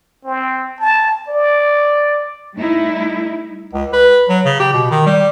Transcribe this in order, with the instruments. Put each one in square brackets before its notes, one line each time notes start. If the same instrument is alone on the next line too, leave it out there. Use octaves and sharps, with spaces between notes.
[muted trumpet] C4
A5
D5
[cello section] G3 A3 D#4 E4
[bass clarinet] C#2
B4
F#3
C#3
G4
B2
D#3
G3